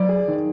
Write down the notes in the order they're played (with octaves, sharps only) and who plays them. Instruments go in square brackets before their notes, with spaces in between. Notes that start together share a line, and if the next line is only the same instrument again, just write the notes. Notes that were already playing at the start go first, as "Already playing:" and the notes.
Already playing: [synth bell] F#3 [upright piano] D5
[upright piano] G#4
D#3